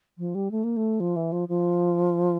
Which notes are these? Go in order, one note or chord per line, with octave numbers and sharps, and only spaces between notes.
F3
G3
A3
A#3
A3
F3
E3
F3
F3